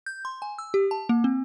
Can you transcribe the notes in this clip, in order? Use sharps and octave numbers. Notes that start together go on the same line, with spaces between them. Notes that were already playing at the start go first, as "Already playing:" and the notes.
G6
C6
G#5
E6
G4
A5
A#3
C4